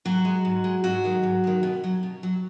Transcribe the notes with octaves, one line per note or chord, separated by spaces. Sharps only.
G#2 F#3 F#4
G#3
G#2
G#3
G#2 F#3 F#4
D#3 G#3
G#2
D#3 G#3
B2
F#3
B2
F#3